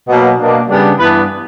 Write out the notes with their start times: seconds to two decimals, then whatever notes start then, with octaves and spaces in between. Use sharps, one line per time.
0.08 B2 F#3 A#3
0.38 B2 A#3 D4
0.68 C#3 G3 B3 D4
0.98 G2 E3 B3 D4 B4